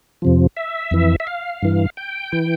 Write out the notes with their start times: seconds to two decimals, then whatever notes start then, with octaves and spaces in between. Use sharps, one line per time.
0.22 F2 C3 F3
0.57 E5
0.91 F2 E3
1.20 E5
1.27 F5
1.62 G2 E3
1.97 G5
2.32 E3